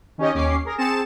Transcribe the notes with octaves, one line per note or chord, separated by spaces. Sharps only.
D#3 C#4 D#4 G4 C#5 D#5
D#2 C#4 D6 C7
G#4 A#4 A#6
C4 G#4 A5 C#7 E7